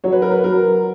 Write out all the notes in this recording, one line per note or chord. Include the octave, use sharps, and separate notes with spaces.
F#3 C#5
B4
A#4
B4
F#3 A#4